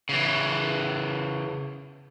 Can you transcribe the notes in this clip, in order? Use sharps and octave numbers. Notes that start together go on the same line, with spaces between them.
C#3 E3